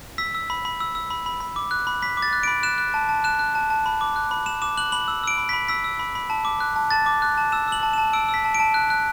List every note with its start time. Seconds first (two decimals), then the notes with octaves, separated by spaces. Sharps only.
0.18 E6 B6
0.35 E6
0.50 B5
0.65 B5
0.80 E6
0.95 E6
1.11 B5
1.26 B5
1.40 B5
1.56 D6
1.71 F#6
1.87 B5
2.02 B5 B6
2.17 D6
2.22 A6
2.33 F#6
2.43 B5 D7
2.63 F#6 E7
2.78 F#6
2.94 A5
3.09 A5
3.24 F#6 E7
3.39 F#6
3.55 A5
3.70 A5
3.86 B5
4.01 D6
4.16 F#6
4.31 B5
4.46 B5 E7
4.62 D6 E7
4.77 F#6 F#7
4.92 B5 F#7
5.08 E6
5.24 E6 D7
5.38 B5
5.49 B5 B6
5.68 E6 B6
5.84 E6
5.99 B5
6.15 B5
6.30 A5
6.45 D6
6.60 F#6
6.76 A5
6.91 A5 A6
7.06 D6
7.22 F#6
7.38 A5
7.52 E6 E7
7.68 E6 F#7
7.83 A5
7.93 A5 E7
8.13 E6 D7
8.29 E6
8.34 B6
8.44 A5
8.55 D7
8.60 A5
8.74 F#6
8.90 F#6